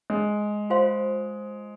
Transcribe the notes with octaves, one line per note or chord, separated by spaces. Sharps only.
G#3
F4 C5 F5 C6